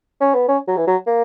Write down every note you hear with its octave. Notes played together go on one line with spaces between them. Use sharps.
C#4
B3
C#4
F#3
E3
F#3
A#3